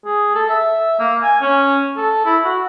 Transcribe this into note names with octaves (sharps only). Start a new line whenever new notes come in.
G#4
A4
E5
A#3
G#5
C#4
A4
E4
F#4